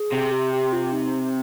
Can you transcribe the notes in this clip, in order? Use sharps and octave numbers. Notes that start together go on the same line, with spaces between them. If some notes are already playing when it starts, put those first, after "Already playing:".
Already playing: G#4
C3
G4
G4
F4
D#4